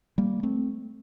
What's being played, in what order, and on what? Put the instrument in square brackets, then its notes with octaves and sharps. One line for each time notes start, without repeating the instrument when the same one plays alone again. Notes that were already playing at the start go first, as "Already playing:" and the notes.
[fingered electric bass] G3 A#3
A3 C4